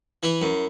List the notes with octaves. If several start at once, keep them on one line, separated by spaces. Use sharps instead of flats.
E3 E4
F#2